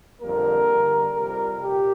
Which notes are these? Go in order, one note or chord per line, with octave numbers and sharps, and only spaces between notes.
F2 D3 G3 A#3 A#4
G2 D3 G3
F2 C3 G3 A#4
A#2 G4